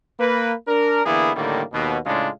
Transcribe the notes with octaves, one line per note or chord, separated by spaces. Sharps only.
A#3 B4
D4 A#4
D3 E3 A#3 B3 E4 G#4
A2 D3 D#3 G3 A#3
D#2 B2
A2 C#3 G#3 D4 F4